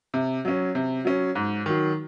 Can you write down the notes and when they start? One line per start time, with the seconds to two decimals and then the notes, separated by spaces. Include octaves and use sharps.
0.14 C3
0.45 F#3 C#4
0.75 C3
1.05 F#3 C#4
1.35 G#2
1.66 D#3 F#3